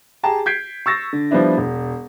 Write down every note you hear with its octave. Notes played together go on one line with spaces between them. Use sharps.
G4 G#4 G5 A5 A#5
G6 G#6 B6 C7 D7
C#6 E6 A6 A#6
D3
F3 G3 B3 D4 E4
E1